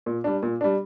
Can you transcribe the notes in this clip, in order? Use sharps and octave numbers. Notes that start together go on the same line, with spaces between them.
A#2
G3 D4
A#2
G3 D4